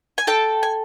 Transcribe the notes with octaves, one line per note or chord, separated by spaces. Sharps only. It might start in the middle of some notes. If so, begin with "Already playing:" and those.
G#5
A4 G5 A5
G#5